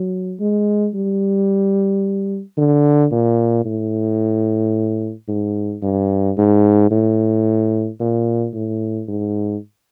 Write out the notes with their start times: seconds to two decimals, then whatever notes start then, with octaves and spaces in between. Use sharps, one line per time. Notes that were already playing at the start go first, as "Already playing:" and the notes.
Already playing: F#3
0.40 G#3
0.94 G3
2.58 D3
3.12 A#2
3.65 A2
5.28 G#2
5.82 G2
6.38 G#2
6.91 A2
8.00 A#2
8.54 A2
9.08 G#2